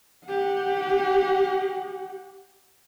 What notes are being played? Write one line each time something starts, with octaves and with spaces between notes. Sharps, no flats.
G4 F#5